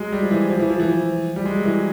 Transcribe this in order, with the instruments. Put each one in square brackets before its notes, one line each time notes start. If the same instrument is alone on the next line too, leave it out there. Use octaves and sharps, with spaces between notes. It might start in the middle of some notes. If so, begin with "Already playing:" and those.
Already playing: [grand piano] F#3 G#3
G3
F3
E3
F3
E3
F3
E3
F3
G3
G#3
F#3
E3